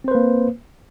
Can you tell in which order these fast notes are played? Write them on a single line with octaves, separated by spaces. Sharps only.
C4 C5 B4 A#3